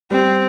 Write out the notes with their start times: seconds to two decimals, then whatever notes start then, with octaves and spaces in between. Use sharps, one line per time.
0.11 G3 C4